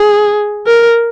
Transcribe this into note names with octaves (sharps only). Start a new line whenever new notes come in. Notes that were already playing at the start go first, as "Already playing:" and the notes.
Already playing: G#4
A#4